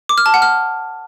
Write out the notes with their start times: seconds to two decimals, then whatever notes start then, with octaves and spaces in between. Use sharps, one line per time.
0.09 D6
0.18 F6
0.26 A5
0.34 F#5
0.42 F6